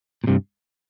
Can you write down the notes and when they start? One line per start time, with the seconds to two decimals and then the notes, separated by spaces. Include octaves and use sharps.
0.24 A#2
0.27 G2 C3